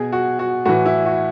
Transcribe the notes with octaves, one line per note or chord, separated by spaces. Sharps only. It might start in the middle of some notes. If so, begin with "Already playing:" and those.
Already playing: B2 G#4
F#4
F#4
A2 E3 F#4
E4
F#4